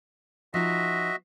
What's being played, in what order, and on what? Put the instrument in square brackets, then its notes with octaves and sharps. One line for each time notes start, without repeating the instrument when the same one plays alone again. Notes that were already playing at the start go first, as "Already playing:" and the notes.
[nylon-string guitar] F3 D#4 [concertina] F#4 D#5 E5